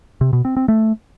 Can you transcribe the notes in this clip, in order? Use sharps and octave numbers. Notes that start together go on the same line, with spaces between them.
C3
B2
C4
C4
A3